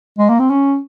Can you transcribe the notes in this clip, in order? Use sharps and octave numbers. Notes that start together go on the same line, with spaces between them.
G#3
A#3
C4
C#4